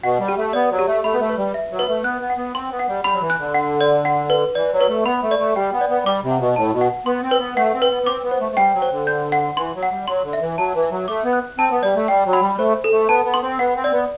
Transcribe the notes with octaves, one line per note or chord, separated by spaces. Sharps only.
B2 F#5
G3
G4
A3
B3 D5
F#3
G4
A3
A3 B5
B3
A3
B4
G3
E5
F#3
B3 B4
A3
B3 F#6
B3
F#5
B3
C4 C6
B3
F#5
G3
G3 B5
F#3
E3
F#6
D3
F#5
D5
F#5
B4
E3 D5
F#3
B4
A3
B3 B5
A3
D5
A3
G3 G5
B3
D5
B3
G3 D6
C3
F#5
B2
A2 A5
B2
F#5
B3 C6
C4
B4
B3
A3 F#5
C4
B4
B3
B3
C4 D6
B3
C5
A3
A3
G3 G5
F#3
C5
D3
G6
F#5
E3 C6
F#3
F#5
G3
F#3 C6
D3
E5
E3
F#3 A5
E3
E5
F#3
A3 D6
B3
F#6
C4 A5
B3
G3 D5
A3
G3 G5
F#3
B5
G3
A3 C5
A4
A3
B3 A5
B3
C6
C4
B3 F#5
C4
D5
B3